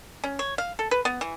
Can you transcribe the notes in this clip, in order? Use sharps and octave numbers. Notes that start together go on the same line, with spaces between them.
C#4
C#5
F5
A4
B4
B3
E3